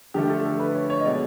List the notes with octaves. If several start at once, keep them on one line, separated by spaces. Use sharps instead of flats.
D3 F3 A3 G4
A4
A4
B4
C#5
C#5
D#5
B2 G#3 D5